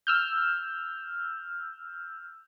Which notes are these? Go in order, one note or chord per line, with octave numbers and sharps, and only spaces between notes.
E6 F6 G6